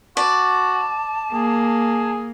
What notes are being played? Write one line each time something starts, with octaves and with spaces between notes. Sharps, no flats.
F#4 D5 A5
A#3 G#4